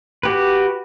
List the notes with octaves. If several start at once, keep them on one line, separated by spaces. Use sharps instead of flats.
F#4 G4 B4